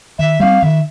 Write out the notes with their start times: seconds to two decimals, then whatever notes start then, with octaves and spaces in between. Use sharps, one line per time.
0.19 D#3 E5
0.40 G3 C4 F5
0.62 D#3 E5